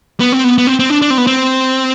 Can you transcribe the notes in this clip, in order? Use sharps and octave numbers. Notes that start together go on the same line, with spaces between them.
B3
C4
B3
B3
C4
C4
D4
D4
C4
B3
C4